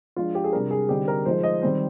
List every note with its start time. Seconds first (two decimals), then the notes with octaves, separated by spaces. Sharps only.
0.16 F3 G#3 D4 F4
0.35 G4
0.44 G#4
0.52 C3 G3 D4 A#4
0.71 G#4
0.89 D3 G3 C4 D#4 G4
1.08 A#4
1.25 F3 G#3 D#4 C5
1.43 D#5
1.62 D#3 G3 C4 C5